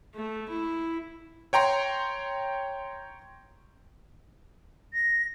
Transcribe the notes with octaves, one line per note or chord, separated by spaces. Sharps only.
A3
E4
C#5 G5 A#5 C6
A#6